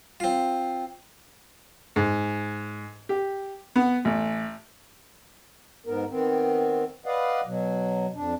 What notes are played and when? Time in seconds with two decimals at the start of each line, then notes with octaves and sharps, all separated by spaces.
0.20 C4 F4
1.96 G#2
3.09 G4
3.76 B3
4.05 A1
5.86 G#2 B3 A#4
6.09 D#3 B3 C4
7.06 B4 D5 D#5 F5 F#5
7.46 B2 F#3
8.15 F2 D4